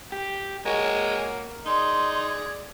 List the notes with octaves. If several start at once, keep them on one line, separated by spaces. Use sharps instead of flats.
G4
G#3 A#3 F#4 A#4 C#5
D#4 G#4 D5 C6